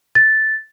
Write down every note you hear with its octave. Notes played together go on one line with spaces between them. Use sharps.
A6